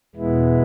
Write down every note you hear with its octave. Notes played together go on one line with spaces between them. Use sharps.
E2 B2 G#3 B3 E4